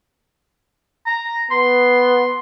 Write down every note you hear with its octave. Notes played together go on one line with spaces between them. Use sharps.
A#5
B3 C6